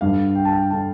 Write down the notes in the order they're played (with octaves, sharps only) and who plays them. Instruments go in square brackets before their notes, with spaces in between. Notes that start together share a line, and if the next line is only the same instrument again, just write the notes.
[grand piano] G2 D3 F5
G5
A5
G5
D3 A5